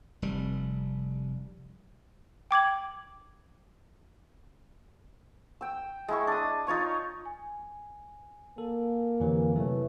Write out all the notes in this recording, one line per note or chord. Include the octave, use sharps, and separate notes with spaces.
F1 G3
G5 D6 G#6 F#7
G5 E6
G#3 E4 C#6
D4 D#6
D#4 F4 C#5 C#6
G#5
A#3 A4
F2 D3 E3 G4 C#5 G#5
C3 F#3 A3 E4 B4 C#5